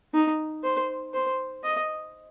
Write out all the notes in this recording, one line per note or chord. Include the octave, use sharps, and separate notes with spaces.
D#4
C5
C5
D#5